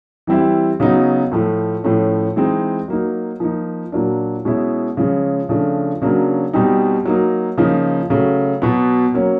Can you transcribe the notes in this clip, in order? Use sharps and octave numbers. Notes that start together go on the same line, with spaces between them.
E3 G3 C4 E4
C#3 F#3 B3 D#4
A2 F3 A3
A2 F3 A3 C#4
E3 G#3 C4 D#4
F#3 A#3 D#4
F3 A#3 D#4
A#2 F#3 A#3 D4
B2 G#3 C#4 E4
C#3 F3 G#3 C#4
C#3 F3 A3 D4
C#3 F#3 A#3 D4
B2 G3 C4 D#4
F#3 A#3 D#4
C#3 F3 A#3 D#4
C#3 F#3 A3
B2 F#3 B3
F#3 A#3 C#4